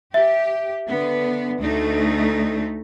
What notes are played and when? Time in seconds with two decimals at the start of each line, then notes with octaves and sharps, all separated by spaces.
0.14 G4 E5
0.87 D3 B3
1.60 D2 A3 D#4